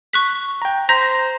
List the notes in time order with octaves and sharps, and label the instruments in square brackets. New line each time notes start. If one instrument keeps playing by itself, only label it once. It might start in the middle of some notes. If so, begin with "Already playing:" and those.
[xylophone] C#6 F#6 B6
[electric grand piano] G5 A#5
[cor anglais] C5 [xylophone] A#5 G6 B6 [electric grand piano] A#6